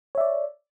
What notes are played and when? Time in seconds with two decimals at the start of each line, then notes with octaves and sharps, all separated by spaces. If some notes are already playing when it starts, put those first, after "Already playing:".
0.15 C#5
0.18 E5
0.20 D5